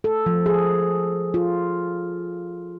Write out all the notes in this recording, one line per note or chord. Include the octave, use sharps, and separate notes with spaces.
A4
F3
G#4
F4